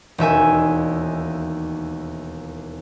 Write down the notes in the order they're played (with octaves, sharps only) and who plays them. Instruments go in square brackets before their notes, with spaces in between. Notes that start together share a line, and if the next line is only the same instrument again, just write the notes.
[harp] E1 D#2 E5 G#5